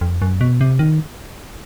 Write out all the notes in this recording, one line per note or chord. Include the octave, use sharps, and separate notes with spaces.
F2
F#2
B2
C3
D#3